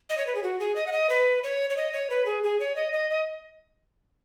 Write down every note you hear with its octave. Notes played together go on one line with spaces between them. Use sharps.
D#5
C#5
B4
G#4
F#4
G#4
D#5
F#5
D#5
B4
C#5
C#5
D#5
C#5
B4
G#4
G#4
C#5
D#5
D#5
D#5